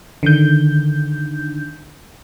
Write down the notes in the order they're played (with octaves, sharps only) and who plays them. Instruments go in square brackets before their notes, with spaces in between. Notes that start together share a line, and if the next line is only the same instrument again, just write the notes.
[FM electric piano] D3 D#3 G6